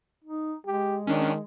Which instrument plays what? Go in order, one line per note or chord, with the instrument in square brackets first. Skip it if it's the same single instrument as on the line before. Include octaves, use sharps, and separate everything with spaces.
[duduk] D#4
[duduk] G#3 [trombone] G4
[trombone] D#3 [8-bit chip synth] C#4 D4